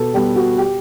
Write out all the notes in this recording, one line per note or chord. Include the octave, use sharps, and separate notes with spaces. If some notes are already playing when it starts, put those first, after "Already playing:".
Already playing: B2 A4 B4
G3 B3 G4
F#4
G4